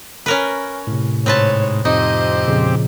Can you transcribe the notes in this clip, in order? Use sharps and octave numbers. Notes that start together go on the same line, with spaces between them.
C#4 A#4 B4
A2 C3
G#2 C4 B4 C#5 A5
F2 C4 D#4 G4 D#5
A#2 C#3 F3